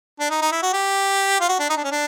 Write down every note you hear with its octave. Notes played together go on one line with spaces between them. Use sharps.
D4
D#4
D#4
E4
F#4
G4
F4
F#4
D4
D#4
D4
C#4
D4